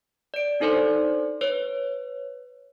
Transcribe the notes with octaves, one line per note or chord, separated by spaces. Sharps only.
D5 D7
D4 D#4 A4 C5 D5 C6
B4 C#5